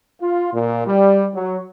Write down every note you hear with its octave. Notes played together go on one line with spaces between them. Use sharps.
F4
A#2
G3
F#3